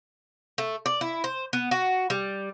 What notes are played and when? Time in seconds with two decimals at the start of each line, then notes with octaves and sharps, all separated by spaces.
0.58 A3
0.86 D5
1.01 E4
1.24 C5
1.53 B3
1.71 F#4
2.10 G3